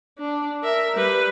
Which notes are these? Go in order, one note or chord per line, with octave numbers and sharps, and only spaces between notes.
D4
A#4 E5
G3 B4